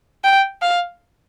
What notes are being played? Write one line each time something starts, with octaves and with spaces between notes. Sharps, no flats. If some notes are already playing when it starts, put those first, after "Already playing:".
G5
F5